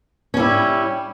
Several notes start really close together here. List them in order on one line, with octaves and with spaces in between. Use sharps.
C#4 G3 E4